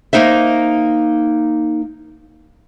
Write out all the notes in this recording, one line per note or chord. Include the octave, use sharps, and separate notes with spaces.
A#3 D#4 C5 E5